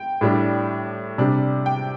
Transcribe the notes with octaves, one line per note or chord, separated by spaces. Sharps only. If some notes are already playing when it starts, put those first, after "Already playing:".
Already playing: G5
A2 G3 D4
C3 G3 D4
G5